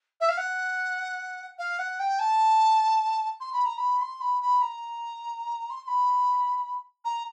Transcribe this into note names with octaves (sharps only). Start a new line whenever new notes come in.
E5
F5
F#5
F5
F#5
G5
A5
C6
B5
A#5
B5
C6
B5
B5
A#5
C6
C6
B5
A#5